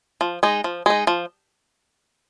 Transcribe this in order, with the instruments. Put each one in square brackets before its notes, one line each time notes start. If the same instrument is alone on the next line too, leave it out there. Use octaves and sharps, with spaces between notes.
[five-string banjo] F3
G#3 D#4
F3
G#3 D#4
F3